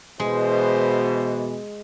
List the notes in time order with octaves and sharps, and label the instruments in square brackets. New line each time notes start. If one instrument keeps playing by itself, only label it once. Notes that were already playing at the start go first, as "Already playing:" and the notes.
[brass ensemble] B2 E3 [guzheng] G#3 [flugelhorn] C5